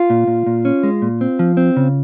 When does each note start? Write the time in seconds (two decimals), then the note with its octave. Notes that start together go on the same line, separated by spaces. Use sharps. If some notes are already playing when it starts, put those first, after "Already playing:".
Already playing: F4
0.10 A#2
0.27 A#2
0.47 A#2
0.65 C#4
0.83 G#3
1.02 A#2
1.21 C4
1.39 F3
1.57 C4
1.77 C#3